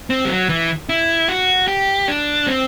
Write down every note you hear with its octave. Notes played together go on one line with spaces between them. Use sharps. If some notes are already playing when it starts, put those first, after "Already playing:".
C4
G3
F#3
E3
E4
F#4
G4
D4
C4